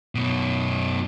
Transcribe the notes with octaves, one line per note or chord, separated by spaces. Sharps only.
F#2 B2